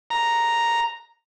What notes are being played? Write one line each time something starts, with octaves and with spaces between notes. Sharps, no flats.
A#5